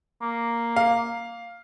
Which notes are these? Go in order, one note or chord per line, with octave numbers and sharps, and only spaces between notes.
A#3
F5